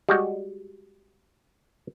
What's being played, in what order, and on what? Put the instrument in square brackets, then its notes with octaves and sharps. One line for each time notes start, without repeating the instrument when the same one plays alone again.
[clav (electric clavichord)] G3 G#3 F#4 D#5